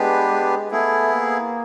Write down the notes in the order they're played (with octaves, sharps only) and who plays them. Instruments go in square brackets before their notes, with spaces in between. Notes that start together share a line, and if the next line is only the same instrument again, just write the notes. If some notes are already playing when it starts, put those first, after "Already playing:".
Already playing: [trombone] G#3 [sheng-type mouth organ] B3 D4 G4 B4
[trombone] G#3
[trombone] A3 [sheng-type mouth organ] B3 E4 G#4
[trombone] A#3